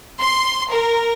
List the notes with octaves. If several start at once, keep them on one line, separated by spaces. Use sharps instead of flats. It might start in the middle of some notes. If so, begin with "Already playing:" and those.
C6
A#4